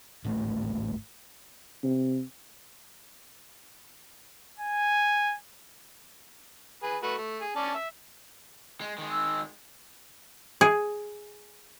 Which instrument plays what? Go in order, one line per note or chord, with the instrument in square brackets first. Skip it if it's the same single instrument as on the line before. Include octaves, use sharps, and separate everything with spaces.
[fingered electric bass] D1 G#1 A2 A3
[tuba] C3
[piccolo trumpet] G#5
[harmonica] G#4 B4
A3 F#4 B4
A3
G#4
C#4 D5 A5
E5
[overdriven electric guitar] G#3
D#3 G#3
[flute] E6
[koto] G#4